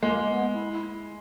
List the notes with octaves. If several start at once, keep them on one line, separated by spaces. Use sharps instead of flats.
G#3 A#3
B3
E4
E4